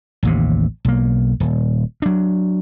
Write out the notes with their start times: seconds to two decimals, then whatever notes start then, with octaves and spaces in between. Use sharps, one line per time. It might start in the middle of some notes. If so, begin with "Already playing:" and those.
0.23 A1 D#2 C3
0.85 B1 A#3
1.40 D#1
2.02 F#3 D4